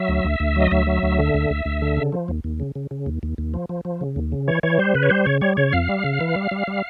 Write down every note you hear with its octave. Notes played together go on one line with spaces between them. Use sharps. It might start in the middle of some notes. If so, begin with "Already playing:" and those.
Already playing: F#3 E5
D2
D2
D2
F#3 D#5
D2 E5
F#3
D2
D3
D2
D2
D2
D3
C#3
F3
D#2
D#2
C#3
C#3
C#3
D#2
D#2
D#2
F3
F3
F3
C#3
D#2
C#3
E3 C#5
E3 C#5
G3 C5
C#3 B4
C#5
G3 C5
C#3 C#5
G3 C#5
C#3 C#5
F2 F5
G3
C#3
E3
G3
G3
G3